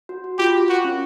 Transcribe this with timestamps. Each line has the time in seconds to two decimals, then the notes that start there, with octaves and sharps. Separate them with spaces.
0.09 F#4
0.24 F#4
0.39 F4 G4
0.54 F4
0.69 F#4 A#4
0.84 C#4